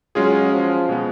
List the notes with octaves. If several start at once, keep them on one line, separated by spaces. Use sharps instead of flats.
F#3 G#3 C#4 F4 G#4
F3
B2 G#3 B3